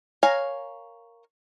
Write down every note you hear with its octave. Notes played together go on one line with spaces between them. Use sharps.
A#4 C#5 F5 G#5 A#5